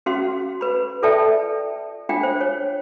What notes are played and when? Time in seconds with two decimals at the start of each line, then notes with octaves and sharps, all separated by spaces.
0.06 C#4 F#4 F5 C6
0.61 B4 B5
1.03 F4 A4 D5 E5 G5 A5
2.09 D4 F4 F5 G5
2.23 C5
2.41 C#5